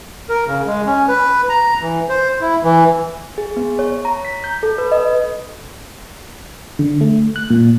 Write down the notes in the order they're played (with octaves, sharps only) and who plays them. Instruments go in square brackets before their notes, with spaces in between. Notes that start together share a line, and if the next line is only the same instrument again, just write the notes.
[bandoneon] A#4
C#3
G#3
C#4
B4
A#5
E3
C5
E4
E3
[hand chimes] G#4
B3
C#5
A#5
B6
G6
A4
B4
D#5
[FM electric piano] D3
A3
F#6
A#2